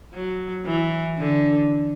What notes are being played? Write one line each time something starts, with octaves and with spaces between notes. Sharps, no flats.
F#3
E3
D3